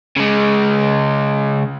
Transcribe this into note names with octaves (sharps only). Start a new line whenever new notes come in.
C#3 G#3